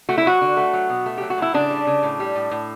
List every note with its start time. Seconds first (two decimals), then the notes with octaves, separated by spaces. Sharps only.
0.09 A3 F#4
0.18 E4
0.25 F#3 F#4
0.41 D3
0.57 A3
0.73 F#3
0.90 B2
1.06 A3
1.18 F#3 G4
1.30 F#4
1.38 A2 E4
1.54 C#3 D4
1.70 G3
1.87 C#3
2.03 A2
2.20 G3
2.35 A2
2.51 A2